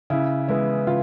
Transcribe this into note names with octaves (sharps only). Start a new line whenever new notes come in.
C#3 E4
E3 G#3 B3 E4
C#3 F4